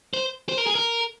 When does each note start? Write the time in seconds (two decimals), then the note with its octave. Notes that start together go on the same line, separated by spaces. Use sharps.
0.14 C5
0.49 C5
0.58 A#4
0.67 G#4
0.75 A#4